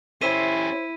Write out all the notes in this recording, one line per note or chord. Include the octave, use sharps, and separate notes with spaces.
C#4 E4 G4 C5 E5 C6 B6 D#7